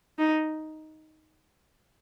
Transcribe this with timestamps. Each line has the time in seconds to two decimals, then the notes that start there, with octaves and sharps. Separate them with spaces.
0.18 D#4